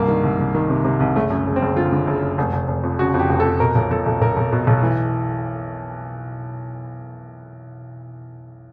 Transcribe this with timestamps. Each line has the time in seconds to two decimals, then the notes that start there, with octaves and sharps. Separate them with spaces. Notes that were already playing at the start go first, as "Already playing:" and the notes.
Already playing: C2 G2 A#3
0.08 D#3
0.23 C2
0.39 C2
0.55 D#3
0.70 C3
0.85 C3
1.00 C2
1.16 F#1 A3
1.30 F#2
1.46 F#1
1.56 C4
1.62 F#1
1.76 D3 F4
1.92 D3
2.07 F#1
2.22 F#1
2.38 F1
2.53 F1
2.68 F1
2.83 F2
2.99 C#3 F#4
3.14 F2
3.19 G4
3.29 F1
3.40 A4
3.45 F2
3.60 B2 A#4
3.75 B1
3.91 B1 A4
4.06 B1
4.22 B1 A#4
4.37 B1
4.52 B2
4.67 B1
4.83 E3